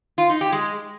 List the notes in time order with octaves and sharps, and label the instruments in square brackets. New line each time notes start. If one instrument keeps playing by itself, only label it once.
[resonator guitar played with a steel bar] F4
D#4
G4
G#3